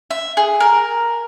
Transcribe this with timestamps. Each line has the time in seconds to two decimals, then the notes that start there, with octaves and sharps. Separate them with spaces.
0.11 E5
0.37 G#4
0.60 A#4